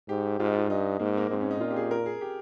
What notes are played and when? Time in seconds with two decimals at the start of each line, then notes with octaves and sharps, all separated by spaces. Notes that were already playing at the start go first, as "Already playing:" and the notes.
0.09 G#2 G4
0.39 G#2 F4
0.47 D#4
0.54 F4
0.69 G2 D#4
1.00 G#2 A#3
1.17 A#3
1.30 G#2 C4
1.41 C#4
1.51 D#4
1.61 A#2 F4
1.71 G4
1.76 G#4
1.81 G4
1.91 A#4
2.06 G#4
2.21 G4